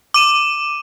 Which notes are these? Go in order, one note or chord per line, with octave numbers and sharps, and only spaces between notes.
D6 D#7 E7